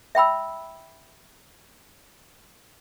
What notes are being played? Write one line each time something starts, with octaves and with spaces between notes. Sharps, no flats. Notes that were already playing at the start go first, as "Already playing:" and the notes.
E5 G5 B5 E6